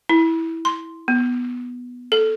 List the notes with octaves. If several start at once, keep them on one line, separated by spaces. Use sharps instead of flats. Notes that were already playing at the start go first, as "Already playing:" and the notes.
E4
C6
B3
A4